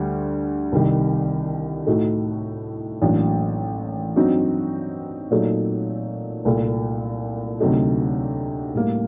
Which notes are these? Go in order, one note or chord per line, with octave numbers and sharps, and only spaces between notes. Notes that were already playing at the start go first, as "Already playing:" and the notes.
Already playing: D2 D3 G3
C2 C3 D#3 G3
A2 A3 D#4 F#4
A1 A2 F#3 A#3 D4
G2 F#3 C4 D#4 F#4
A#2 F#3 A3 D#4
C2 A#2 A3
D2 C3 F#3 A3 D#4
A2 G3 A#3